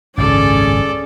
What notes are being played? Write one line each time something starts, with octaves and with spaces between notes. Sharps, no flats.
G#1 C#2 F#2 C#4 G#4 A4 D5